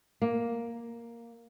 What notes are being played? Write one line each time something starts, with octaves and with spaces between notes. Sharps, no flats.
A#3